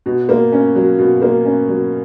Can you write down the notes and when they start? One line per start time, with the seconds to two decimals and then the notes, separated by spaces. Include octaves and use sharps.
0.06 B2
0.29 A#3
0.52 C#4
0.76 F#3
0.99 B2
1.22 A#3
1.45 C#4
1.68 F#3